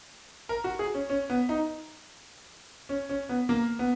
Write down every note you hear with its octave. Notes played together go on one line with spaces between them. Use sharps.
A#4
F#4
G#4
C#4
C#4
B3
D#4
C#4
C#4
B3
A#3
B3